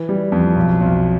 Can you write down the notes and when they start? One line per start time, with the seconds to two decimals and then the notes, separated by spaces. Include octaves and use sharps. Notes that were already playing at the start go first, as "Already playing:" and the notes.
Already playing: E3
0.09 G3
0.32 F2
0.56 B1
0.80 B1